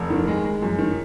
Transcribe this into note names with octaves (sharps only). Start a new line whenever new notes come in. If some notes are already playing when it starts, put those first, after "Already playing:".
Already playing: F1
D#3
G#3
G#3
F#2
D#3